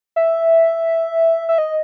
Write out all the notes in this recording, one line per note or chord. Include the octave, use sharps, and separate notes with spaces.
E5
E5
D#5